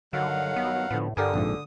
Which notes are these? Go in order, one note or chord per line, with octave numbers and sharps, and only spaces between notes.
G2 D3 D#3 F#3 F5 F#5
B3
A2 D3 F3 B3
G2 D3 G4 A#4 G#5 D#6
A#1 F2 G#2